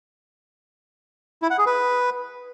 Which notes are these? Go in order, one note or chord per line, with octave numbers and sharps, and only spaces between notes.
E4
F#5
G#4
B4